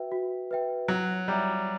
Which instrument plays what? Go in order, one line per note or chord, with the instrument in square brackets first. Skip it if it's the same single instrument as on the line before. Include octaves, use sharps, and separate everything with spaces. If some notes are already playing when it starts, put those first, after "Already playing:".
Already playing: [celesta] F#4 B4 E5 G5
F#4
B4 E5 G5
[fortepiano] F#3 [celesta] C#5
[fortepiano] G3 [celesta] E5 A#5